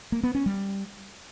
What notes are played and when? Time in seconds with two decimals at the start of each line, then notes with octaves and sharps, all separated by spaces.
0.12 A#3
0.23 B3
0.35 C#4
0.46 G3